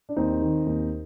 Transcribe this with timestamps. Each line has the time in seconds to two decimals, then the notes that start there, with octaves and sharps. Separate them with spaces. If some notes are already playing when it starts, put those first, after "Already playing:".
0.09 D4
0.17 D#2 C4 D#4
0.41 D#3
0.66 D#2